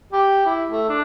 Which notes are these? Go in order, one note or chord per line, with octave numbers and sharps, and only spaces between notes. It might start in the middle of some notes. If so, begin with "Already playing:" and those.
G4
E4
A3
D4